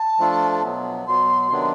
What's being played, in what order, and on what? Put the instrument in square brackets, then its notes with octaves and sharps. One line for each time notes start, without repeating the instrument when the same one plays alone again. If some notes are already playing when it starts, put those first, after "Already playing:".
Already playing: [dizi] A5
[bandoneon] F3 A3 D4 F4 A4
B2 F#3 B3
[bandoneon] B2 F#3 B3 [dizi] C6
[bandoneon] C3 D#3 F#3 B3 D4